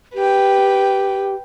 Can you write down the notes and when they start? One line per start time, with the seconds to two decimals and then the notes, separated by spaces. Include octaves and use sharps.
0.15 G4 B4 G5